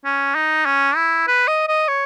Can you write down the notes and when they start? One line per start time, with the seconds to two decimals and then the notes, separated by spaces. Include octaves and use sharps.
0.05 C#4
0.35 D#4
0.66 C#4
0.96 E4
1.28 B4
1.48 D#5
1.68 D#5
1.88 C#5